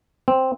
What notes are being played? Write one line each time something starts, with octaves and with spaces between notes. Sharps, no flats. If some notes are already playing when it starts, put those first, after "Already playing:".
C4